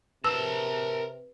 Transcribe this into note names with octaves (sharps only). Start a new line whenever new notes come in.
C3 A#4 B4 A5 E6